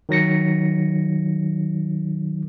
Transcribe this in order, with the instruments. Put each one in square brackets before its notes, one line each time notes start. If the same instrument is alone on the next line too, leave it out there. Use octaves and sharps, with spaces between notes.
[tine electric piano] D#3 F#3 A#6 C#7